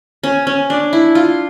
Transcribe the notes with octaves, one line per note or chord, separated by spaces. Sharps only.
C#4
C#4
D4
E4
F4